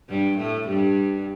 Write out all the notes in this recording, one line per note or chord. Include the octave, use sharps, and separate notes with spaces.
G2 G3
A2 A3
G2 G3